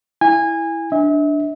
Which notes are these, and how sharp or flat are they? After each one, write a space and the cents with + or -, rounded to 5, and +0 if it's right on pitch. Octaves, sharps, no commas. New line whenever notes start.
E4 +0 G#5 -20
D4 +0 E5 -40